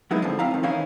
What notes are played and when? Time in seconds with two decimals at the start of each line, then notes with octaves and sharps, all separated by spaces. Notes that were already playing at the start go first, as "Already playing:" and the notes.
0.11 F#3 G#3 B3 D#4 E4
0.22 F2 G#2 D3 F3
0.39 C4 E4 F5 A#5
0.51 F2 D#3
0.63 D#3 E3 C#4 D#4 E4 F5